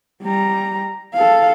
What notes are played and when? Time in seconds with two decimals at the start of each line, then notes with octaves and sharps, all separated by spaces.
0.23 G3 A#5
1.14 A4 F5